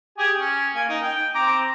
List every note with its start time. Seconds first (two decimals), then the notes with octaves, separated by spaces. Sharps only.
0.18 G4 G#4 G#5
0.39 C#4
0.75 A#3 G#5
0.89 D#4
1.02 G5
1.35 C4 A#5 D6